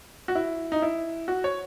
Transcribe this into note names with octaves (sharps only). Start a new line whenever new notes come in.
F#4
E4
D#4
E4
F#4
C#5